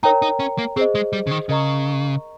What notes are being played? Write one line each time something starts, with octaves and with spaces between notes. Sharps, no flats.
D#4 A#4 C#5 G5 A#5
D#4
C#4
A#3
C4 G#4 C5 D#5
G#3
G3
C#3
D#3
C#3 A#4 D#5 A#5 C#6